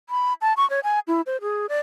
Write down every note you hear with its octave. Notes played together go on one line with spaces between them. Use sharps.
B5
A5
C#6
C#5
G#5
E4
C5
G#4
D5